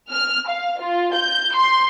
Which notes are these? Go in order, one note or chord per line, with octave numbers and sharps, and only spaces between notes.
F6
F5
F4
G6
C6